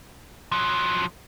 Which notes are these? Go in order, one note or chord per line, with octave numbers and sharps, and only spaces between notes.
F3 F#3